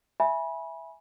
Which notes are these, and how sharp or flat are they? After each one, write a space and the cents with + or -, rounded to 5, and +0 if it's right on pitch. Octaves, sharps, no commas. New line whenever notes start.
E5 +0 G#5 +0 B5 -25